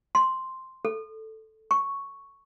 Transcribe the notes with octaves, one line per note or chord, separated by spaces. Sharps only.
C6
A4
C#6